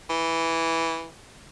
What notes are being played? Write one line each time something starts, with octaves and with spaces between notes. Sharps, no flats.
E3